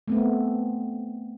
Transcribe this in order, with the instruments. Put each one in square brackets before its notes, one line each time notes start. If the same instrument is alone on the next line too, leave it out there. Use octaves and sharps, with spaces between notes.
[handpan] A3 B3 C4